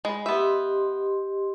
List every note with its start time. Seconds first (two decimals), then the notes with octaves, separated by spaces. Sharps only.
0.05 G#3 B5
0.26 B3 G4 D#5 E5 C6